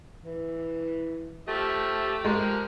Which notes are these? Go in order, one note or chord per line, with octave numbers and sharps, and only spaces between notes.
E3
F3 A3 G4 E5
F3 G#3 A#4